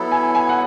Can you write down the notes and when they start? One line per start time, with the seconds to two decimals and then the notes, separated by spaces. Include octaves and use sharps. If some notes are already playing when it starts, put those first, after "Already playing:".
Already playing: F#3 B3 E4 A4
0.12 G#5
0.35 G#5
0.49 F#5